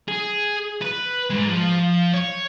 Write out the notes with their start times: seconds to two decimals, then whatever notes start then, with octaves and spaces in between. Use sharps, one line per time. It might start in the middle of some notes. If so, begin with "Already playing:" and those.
0.08 G#4
0.82 B4
1.30 G#2 G#3
1.48 F3
2.14 C#5